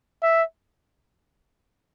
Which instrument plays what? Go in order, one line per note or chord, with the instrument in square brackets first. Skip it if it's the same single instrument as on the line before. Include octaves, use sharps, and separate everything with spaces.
[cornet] E5